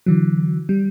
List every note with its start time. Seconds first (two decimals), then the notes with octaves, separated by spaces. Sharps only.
0.06 D3 E3 F#3
0.69 G3